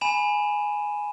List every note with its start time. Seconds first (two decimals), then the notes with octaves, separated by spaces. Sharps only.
0.01 G#5 B5 D#7 E7